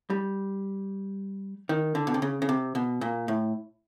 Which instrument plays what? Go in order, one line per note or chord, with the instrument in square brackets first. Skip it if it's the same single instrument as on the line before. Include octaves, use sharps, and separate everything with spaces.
[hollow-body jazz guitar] G3
D#3
D3
B2
C3
C#3
C#3
C3
B2
A#2
A2